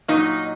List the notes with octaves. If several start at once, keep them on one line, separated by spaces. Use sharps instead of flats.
A#2 F#3 D#4